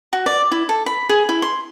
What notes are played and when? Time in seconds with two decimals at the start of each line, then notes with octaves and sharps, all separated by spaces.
0.13 F#4
0.26 D5
0.52 E4
0.69 A4
0.86 B5
1.09 G#4
1.29 E4
1.42 C6